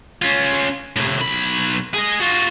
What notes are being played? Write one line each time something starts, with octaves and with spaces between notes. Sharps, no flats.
C#4 F4
A2 C3
B1 B5
G#4 D#5
F4 F#4